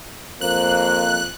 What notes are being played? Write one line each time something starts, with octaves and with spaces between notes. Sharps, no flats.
F2 A#3 C5 F#6